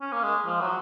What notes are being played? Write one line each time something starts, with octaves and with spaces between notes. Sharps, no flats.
C#4
A#3
G#3
F3
F#3